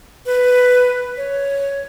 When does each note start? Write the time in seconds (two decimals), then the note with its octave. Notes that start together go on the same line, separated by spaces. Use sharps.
0.26 B4
1.17 C#5